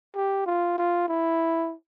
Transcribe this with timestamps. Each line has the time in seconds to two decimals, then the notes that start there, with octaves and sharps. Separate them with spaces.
0.16 G4
0.46 F4
0.78 F4
1.08 E4